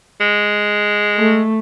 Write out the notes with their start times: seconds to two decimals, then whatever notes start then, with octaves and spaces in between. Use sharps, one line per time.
0.21 G#3
1.18 A3